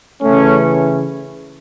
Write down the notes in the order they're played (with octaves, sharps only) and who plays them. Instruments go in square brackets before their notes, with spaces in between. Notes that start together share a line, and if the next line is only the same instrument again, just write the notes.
[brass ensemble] C#3 E3 A3 C#4